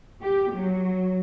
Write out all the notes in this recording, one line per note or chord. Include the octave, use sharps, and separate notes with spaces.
G4
F#3